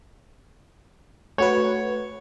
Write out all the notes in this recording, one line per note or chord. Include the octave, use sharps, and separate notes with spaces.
A3 F#4 B4 C#5